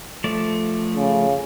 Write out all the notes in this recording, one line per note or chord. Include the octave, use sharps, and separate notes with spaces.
F3 A3 D5
C#3